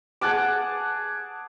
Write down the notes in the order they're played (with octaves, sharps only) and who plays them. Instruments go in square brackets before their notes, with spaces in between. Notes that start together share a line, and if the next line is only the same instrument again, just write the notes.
[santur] G#4 F#5 A5 D6